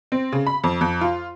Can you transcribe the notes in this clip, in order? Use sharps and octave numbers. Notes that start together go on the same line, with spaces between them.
C4
C#3
B5
F2
F2
F4